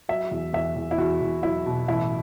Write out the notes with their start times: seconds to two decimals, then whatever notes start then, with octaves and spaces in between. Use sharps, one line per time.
0.09 F#3 E5
0.31 E2
0.53 E2 E5
0.76 E2
0.91 E4
0.98 E2 F#4
1.22 E2
1.43 F#3 E4
1.66 B2
1.88 A1 E4